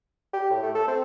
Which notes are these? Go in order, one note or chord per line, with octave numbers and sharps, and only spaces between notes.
G4
A2
A3
A4
C4